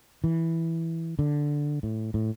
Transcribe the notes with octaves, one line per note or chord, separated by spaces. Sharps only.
E3
D3
A2
A2